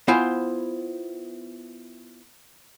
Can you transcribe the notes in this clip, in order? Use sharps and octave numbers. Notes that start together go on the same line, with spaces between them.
B3 E4 F4 C5 G#5